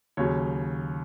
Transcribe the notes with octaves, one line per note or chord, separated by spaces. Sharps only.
D#2 C#3 F#3 C#5